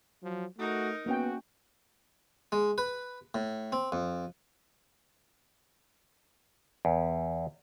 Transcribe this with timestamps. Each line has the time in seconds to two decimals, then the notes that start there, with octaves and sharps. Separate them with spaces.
0.23 F3 F#3
0.59 A3 D#4 F#4 A#4
1.06 A#3 B3 C#4 F#4 G5
2.52 G#3
2.78 B4
3.35 A2
3.72 C4
3.92 F2
6.85 E2